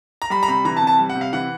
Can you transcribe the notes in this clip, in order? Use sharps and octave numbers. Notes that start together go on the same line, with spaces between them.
A#5
G3 B5
A#5
C3 B5
E3 A#5
A5
C3
A5
G3
F#5
C3
F5
E3 F#5